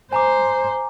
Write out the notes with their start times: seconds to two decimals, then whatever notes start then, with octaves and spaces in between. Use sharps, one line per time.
0.13 C5 G#5 A#5 D6